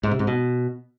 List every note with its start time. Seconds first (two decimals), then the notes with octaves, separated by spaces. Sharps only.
0.03 G#2
0.11 C3
0.19 G#2
0.27 B2